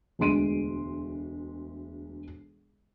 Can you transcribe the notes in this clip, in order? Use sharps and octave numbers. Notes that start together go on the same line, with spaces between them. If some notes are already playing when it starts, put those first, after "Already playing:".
E1 D2 G#3 C6 D7 D#7